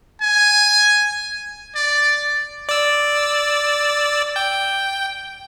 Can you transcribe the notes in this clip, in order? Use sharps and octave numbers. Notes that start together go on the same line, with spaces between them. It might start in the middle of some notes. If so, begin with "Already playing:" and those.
G#5
D5
D5 E6
G5